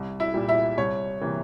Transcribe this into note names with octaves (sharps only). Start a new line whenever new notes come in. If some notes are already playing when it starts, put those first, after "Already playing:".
Already playing: C2
E4 E5
A#2 G3
E4 E5
C2 C#5
C3 E3 A#3